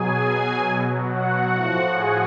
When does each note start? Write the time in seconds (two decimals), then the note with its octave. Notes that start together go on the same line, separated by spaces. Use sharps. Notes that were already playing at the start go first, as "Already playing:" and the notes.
Already playing: B2 F#3 G#4 G#5
0.67 B2 F#3
1.10 F#4 F#5
1.52 A2 F3
1.96 G#4 G#5